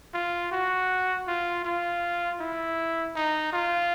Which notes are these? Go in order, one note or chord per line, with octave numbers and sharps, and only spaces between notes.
F4
F#4
F4
F4
E4
D#4
F4